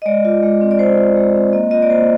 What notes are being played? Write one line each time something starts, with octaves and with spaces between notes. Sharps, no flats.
D#5
G#3 D5
F4
G#3
C4
D5
G#3 C5
F4
G#3
C4
A#3 D#5
F4 D#5
D5
A#3 C5